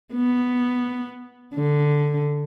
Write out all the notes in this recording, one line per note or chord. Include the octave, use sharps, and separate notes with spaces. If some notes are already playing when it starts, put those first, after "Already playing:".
B3
D3